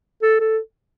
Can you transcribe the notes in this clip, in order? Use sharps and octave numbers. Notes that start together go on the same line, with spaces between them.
A4
A4